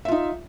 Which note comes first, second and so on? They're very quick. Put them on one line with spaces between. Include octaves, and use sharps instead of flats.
E5 F4 D#4